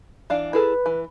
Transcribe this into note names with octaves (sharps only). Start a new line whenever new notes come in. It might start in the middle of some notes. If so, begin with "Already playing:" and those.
E3 D4 F5
E4 G#4 A4 B4
E3